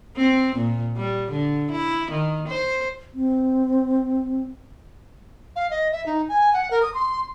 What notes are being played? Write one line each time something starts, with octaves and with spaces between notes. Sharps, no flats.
C4
A#2
G3
D3
E4
D#3
C5
C4
F5
D#5
E5
D#4
G#5
F#5
A#4
D#6
C6